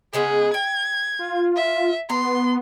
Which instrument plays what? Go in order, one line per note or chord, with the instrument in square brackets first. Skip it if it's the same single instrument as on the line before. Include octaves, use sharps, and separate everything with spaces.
[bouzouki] C#3 G#3 B3 [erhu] G#4
[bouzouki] G5 [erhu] G#6
[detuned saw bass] F4
[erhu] E5
[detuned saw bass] B3 [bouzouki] A#5 [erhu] C6